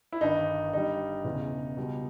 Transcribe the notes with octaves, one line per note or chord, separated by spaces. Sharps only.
E4
G1 G2 D#3 D#4
G1 G2 G3 D#4
E1 E2 C#3 E3
C#2 B2 G3